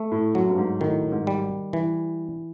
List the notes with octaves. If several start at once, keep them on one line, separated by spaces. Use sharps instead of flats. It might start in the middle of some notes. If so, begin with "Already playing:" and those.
Already playing: A3
A2
F#2 F#3
G2
G#2
A2 D#3
G#2
G3
E3